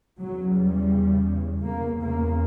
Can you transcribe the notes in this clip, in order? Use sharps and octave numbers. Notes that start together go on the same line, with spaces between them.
E2 C#3 F#3
G3
E2 C#3 A#3
A#3